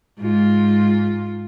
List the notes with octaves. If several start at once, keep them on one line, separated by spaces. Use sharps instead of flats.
G#2 F4